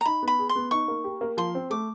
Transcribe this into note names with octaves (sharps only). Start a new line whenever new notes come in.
A#5
D#4 B5
B3 B5
G#4
C6
B3
D#4 C#6
A#3
G4
A#3
F3 C6
C4
A3 D6